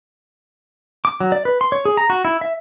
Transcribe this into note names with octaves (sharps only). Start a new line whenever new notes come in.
D6
F#3
D5
B4
C6
C#5
G#4
A#5
F#4
E4
E5